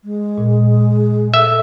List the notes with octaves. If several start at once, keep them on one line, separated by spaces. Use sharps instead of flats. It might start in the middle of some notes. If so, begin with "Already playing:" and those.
G#3
A#2
A4 E5